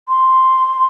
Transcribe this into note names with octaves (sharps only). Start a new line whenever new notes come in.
C6